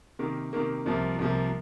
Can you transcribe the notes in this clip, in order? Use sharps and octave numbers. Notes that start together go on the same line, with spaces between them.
C3 D#3 A#3
C3 D#3 A#3
C2 C3 F3 A#3
C2 C3 F3 A#3